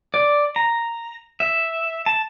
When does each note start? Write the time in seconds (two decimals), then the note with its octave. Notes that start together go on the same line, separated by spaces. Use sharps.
0.14 D5
0.56 A#5
1.40 E5
2.06 A5